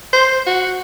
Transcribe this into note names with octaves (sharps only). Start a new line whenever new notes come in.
C5
F#4